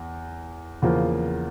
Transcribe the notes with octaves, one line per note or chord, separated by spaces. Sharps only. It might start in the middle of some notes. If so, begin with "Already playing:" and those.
Already playing: E2
E2 C#3 F3 A#3